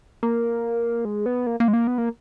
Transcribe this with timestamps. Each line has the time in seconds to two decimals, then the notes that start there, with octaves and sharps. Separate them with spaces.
0.23 A#3
1.05 G#3
1.26 B3
1.47 A#3
1.60 A#3
1.68 G#3
1.73 A#3
1.87 B3
1.98 A#3